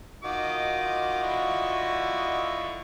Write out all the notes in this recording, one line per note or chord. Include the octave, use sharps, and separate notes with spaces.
D#3 F4 F#4 D#5 D6
D3 E4 C#6